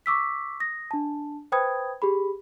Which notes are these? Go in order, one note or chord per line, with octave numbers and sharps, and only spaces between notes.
C#6 D6 E6 B6
D#6 A#6
D4 A5
B4 C5 G5 B5 D#6 G#6
G4 G#4 B5